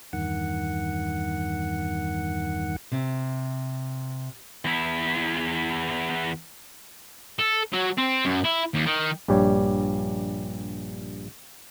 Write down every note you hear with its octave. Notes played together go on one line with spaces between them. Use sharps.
E2 G2 D#3 F#5
C3
E2 E4
A4
F#3
C4
F#2
E4
D#2
D#3
A#1 G2 G3 G4 C#5